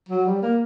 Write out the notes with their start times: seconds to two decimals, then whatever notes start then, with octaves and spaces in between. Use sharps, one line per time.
0.09 F#3
0.26 G3
0.42 A#3